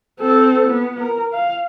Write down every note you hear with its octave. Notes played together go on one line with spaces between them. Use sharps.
C4 A4
B3
A#4
F5